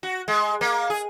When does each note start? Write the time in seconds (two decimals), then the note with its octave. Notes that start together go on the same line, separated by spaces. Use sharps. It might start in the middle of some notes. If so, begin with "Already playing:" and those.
0.03 F#4
0.28 G#3
0.61 A#3
0.90 G#4